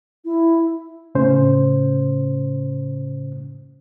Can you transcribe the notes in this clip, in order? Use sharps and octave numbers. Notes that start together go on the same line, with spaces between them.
E4
A2 C#3 C#4 C5